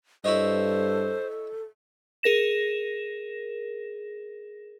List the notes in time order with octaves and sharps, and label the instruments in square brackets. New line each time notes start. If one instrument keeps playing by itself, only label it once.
[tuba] G2 [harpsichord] E4 C#5 D#5 [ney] A4 [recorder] C5
[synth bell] G#4 A#4 A#6 E7